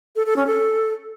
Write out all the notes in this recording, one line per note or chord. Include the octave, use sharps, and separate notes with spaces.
A4
A4
C#4
A4